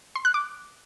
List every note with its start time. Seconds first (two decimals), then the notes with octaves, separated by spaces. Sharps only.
0.16 C6
0.25 F#6
0.34 D6